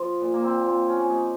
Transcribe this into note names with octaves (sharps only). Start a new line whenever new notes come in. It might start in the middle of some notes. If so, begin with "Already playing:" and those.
Already playing: F3
A#2
A#3
C4
F3 C4
C#4
C#4
C3 D#4